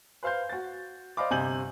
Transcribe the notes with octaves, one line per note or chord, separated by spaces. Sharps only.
B4 C5 F5 C6 G6
F#4 A6
C5 D5 D#5 F5 B5 D6
G1 C3 D#5 G#5 G6 F#7